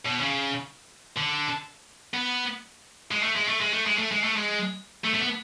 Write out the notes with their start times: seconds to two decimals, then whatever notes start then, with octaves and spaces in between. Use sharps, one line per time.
0.06 B2
0.21 C#3
1.17 D3
2.14 B3
3.11 G#3
3.23 A3
3.36 G#3
3.48 A3
3.61 G#3
3.73 A3
3.86 G#3
3.98 A3
4.11 G#3
4.24 A3
4.36 G#3
5.04 A3
5.15 A3
5.20 B3